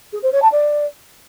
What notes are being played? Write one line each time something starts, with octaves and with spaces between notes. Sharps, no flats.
G#4
C5
C#5
A5
D5